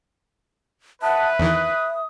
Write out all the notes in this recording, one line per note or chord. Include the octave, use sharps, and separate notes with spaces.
B4 E5 F#5 A5 D#6
E2 D#3 E3 D#6